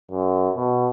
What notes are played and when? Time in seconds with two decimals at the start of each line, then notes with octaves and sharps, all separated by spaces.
0.11 F#2
0.56 B2